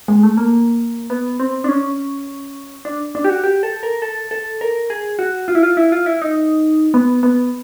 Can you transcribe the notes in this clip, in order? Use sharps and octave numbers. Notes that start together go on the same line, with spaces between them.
G#3
A3
A#3
B3
C4
D4
C#4
D4
D4
G4
F#4
G4
A4
A#4
A4
A4
A#4
G#4
F#4
F4
E4
F4
E4
F4
E4
D#4
B3
B3